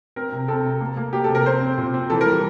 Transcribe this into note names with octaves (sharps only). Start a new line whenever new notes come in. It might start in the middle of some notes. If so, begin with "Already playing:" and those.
C4 A#4
C3
C4 A4
C3
A#3
A#3
A#3 G4
A4
C3
A#4
C4 C5
C4
A#2
C4
E3 A4
A#4
G3